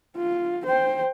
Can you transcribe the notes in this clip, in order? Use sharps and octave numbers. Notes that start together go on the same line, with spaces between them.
F4
C5 G5